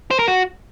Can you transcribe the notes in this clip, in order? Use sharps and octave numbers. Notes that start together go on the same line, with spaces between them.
C5
A#4
F#4